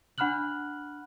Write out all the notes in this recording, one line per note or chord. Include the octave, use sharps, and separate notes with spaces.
D4 F#5 B5 F6 F#6 F#7